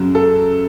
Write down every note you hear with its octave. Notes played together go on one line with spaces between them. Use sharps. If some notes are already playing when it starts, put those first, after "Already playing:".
Already playing: F#2 C#3 F#3
A4